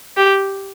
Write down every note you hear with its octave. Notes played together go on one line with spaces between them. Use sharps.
G4